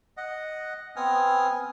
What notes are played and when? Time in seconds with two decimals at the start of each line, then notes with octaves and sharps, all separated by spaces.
0.17 D#5 F#5
0.96 B3 C4 G#5 D#6 F6